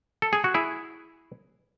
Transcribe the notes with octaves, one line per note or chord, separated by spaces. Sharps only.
A4
G#4
F#4
E4 G#4